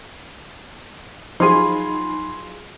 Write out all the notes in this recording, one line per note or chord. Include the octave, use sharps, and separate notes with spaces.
F3 F#3 D#4 F4 G#4 G#5 B5 C6